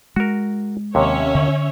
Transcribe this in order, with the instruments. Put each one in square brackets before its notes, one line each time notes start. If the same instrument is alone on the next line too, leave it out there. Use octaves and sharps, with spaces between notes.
[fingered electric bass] G#3 [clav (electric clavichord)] F#4 A#4
[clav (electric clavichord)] D#2 C3 [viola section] C#4 C#5 E5
[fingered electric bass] D3